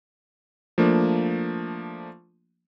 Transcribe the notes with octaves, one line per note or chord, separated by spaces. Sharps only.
F3 A3 A#3 D4